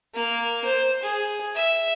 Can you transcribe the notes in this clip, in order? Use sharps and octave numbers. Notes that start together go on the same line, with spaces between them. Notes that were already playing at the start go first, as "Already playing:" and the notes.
A#3
C5
G#4
E5